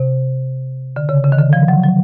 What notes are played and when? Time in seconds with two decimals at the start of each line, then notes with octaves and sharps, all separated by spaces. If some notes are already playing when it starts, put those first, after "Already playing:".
Already playing: C3
0.96 D3
1.09 C#3
1.24 C#3
1.32 D#3
1.39 D3
1.53 F3
1.68 F#3
1.83 F#3